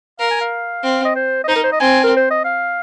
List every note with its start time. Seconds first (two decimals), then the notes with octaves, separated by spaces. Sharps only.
0.19 A#4 F5
0.30 G#5
0.41 F5
0.83 C4
1.05 D#5
1.15 C5
1.44 D#5
1.48 D#4 C5
1.56 A#4
1.63 C5
1.72 D#5
1.80 C4 G#5
2.04 A#4
2.17 C5
2.30 D#5
2.45 F5